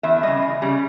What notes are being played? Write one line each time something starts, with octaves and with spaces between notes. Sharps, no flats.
E2 E5
C#3 G3 D#5
E2
C#3 G3